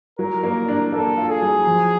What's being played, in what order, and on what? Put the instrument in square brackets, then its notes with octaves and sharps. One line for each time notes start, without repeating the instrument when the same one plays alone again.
[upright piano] F#3 [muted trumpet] A#4
[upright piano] A#3
D4
[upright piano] A#3 [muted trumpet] A4
[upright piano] F4
[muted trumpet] G#4
[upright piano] F#3
F3